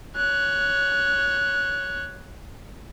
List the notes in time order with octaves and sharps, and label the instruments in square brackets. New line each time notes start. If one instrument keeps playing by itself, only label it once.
[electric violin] C#5 F#6